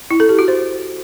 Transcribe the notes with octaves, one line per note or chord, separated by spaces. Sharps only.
E4
A4
G4
F#4
C5